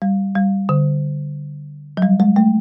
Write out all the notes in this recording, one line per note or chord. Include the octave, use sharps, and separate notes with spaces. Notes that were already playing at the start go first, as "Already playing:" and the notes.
G3
G3
D3
F#3
G3
G#3
A3